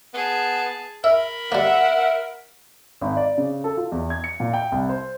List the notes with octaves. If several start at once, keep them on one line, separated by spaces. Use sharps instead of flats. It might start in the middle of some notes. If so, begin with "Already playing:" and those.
B3 G#4 A5
A#4 E5 B5
G3 A#3 E5 F#5
G#1
D5
C#3
A4
F4
E2
G#6
C#7
A#2
G5
C2
C5